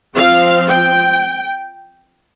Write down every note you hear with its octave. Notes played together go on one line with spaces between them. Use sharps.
F3 C4 F5
G5